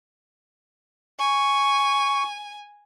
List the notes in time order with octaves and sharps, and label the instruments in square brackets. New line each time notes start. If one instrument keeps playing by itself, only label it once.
[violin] G#5 [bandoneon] C#6